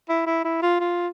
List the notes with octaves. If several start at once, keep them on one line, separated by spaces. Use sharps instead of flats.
E4
E4
E4
F4
F4